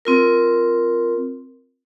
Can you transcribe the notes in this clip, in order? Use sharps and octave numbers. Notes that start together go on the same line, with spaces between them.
C4 F4 A#4